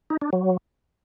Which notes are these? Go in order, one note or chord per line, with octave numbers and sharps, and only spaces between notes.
D#4
D4
F#3